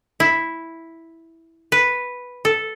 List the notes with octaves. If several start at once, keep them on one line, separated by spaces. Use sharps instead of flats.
E4
B4
A4